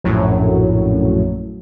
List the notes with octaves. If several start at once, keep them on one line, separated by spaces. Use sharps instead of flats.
A#1 F#2 A2 F#3